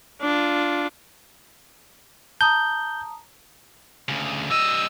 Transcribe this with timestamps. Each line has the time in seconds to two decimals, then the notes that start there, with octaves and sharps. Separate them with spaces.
0.22 D4 F4
2.41 A5 A#5 D#6 G6
4.08 D2 C#3
4.50 G3 D#5 E6